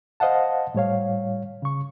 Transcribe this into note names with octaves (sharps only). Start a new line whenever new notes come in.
C5 D#5 F5 F#5 A5
A2 G3 C#5 F5
C#3 C#6